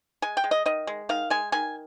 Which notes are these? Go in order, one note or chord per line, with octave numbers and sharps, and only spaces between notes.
G#3 G#5
G5
G#3
D#5
D#3 D#5
G#3
D#3 F5
G#3 G#5
D#3 G#5